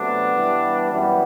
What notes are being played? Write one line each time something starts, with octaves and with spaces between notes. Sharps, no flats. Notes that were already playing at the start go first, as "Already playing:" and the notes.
Already playing: C3 F#3 A3 B3 D4
G2 E3 G3
F#2 E3 G3 B3